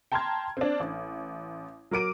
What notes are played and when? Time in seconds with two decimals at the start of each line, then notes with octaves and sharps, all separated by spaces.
0.12 G5 A5 A#5 C6 F6 G#6
0.57 C4 D4
0.80 A1
1.91 F#3 A#4 D6 D7 D#7